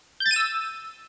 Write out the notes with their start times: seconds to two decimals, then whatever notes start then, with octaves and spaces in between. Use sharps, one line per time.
0.20 G6
0.26 A6
0.31 D#7
0.36 E6